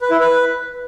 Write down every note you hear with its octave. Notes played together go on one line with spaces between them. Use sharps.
B4
E4
B4